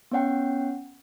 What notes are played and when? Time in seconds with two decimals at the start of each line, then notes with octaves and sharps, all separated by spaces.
0.11 B3 C#4 C#5 F#5 G5